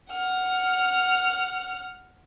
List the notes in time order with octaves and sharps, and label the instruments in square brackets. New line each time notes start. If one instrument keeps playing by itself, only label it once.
[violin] F#5 F6